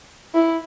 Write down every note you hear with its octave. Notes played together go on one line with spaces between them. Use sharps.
E4